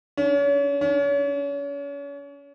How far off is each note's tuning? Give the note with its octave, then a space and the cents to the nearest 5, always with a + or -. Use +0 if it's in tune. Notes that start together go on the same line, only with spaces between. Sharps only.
C#4 +35
C#4 +35